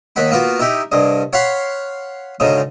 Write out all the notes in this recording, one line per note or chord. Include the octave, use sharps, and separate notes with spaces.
D#2 D#3 F#5 B5
A#3 B3 F4 F#4
D#4 E4 G4
C2 G2 D#5
C#5 F5 F#5 B5 C6
D2 G#2 C#3 D#4